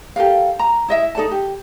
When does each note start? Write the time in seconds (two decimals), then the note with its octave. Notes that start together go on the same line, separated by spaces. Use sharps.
0.16 G4 A4 A#4 F5
0.59 A#5
0.88 E4 D#5 E5
1.15 D#4 A4 D5 A5
1.31 G4